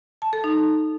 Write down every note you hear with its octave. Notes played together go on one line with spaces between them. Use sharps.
A5
A4
D#4